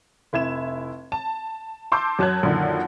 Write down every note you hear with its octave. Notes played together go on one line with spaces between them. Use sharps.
F1 E4 G#6 E7
A5
A5 C6 D6 E6 G6
F#2 F#3 A5 F#6 G#6
F#2 A#2 D3 D#3